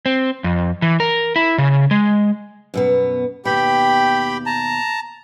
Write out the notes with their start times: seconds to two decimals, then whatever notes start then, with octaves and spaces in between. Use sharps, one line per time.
0.06 C4
0.44 F2
0.82 E3
1.00 A#4
1.36 E4
1.58 C#3
1.91 G#3
2.74 F#2 B2 B3
3.45 D#2 B2 G4 G5 B5
4.46 A5 A#5